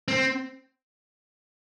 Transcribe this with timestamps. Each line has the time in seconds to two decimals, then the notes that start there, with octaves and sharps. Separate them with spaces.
0.08 C4